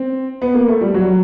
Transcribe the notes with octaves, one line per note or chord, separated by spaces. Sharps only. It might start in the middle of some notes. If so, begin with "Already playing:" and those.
Already playing: C4
B3
A#3
A3
G3
F#3